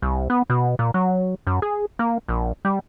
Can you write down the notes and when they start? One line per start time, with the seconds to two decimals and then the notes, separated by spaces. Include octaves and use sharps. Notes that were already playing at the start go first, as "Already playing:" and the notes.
0.02 C2
0.30 B3
0.50 B2
0.79 A#2
0.94 F#3
1.47 F#2
1.62 G#4
1.99 A#3
2.28 A#1
2.65 G3